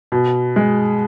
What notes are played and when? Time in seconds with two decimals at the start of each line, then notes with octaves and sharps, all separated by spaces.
0.12 B2
0.56 G#3